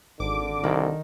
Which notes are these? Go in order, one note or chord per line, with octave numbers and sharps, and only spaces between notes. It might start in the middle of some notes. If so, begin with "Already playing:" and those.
G#1 D3 D6
C2 D#3